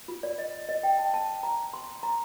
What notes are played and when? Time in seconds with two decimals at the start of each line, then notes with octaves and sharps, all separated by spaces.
0.08 F4
0.23 D5
0.38 D#5
0.69 D#5
0.83 G5
0.99 A5
1.14 A5
1.43 A#5
1.73 C6
2.03 A#5